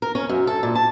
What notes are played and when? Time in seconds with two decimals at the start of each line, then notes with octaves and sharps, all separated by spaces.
0.02 A#4
0.15 C#4
0.29 F#2
0.47 A4
0.63 A#2
0.75 A5